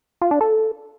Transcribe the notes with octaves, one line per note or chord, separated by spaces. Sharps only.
F4
D4
A4